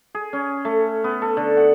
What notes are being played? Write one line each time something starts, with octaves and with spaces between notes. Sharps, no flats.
G#4
C#4
A3
B3
A4
D3
F#5